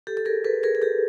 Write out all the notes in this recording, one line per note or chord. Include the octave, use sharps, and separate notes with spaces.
G4 A4
A4
G#4 A#4
A4 B4
G#4 A#4
G#4
G4 A4